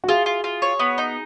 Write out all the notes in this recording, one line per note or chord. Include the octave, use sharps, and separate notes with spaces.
F#4
F4 G#4
F4
F4
C#5
B3
D#4